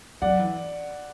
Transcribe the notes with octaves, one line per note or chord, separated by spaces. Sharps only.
F#3 D5 F#5
E3